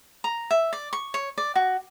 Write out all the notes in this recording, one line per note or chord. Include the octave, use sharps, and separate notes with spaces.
A#5
E5
D5
C#6
C#5
D5
F#4